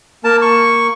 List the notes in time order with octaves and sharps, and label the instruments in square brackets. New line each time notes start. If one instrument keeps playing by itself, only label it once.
[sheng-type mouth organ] A#3 [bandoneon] A#4 A5
[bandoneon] C#6